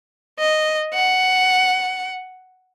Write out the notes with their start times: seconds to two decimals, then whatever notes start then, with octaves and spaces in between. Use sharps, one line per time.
0.40 D#5
0.94 F#5